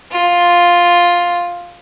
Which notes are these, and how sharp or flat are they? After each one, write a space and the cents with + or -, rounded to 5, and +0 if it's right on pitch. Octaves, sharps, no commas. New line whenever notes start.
F4 +5